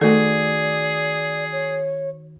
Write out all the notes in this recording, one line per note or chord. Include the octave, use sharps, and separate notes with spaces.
D#3 A3 F#4 G#4 A4 D5
C#5